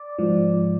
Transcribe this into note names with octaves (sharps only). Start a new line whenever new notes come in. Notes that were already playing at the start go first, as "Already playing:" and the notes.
Already playing: D5
G#2 F3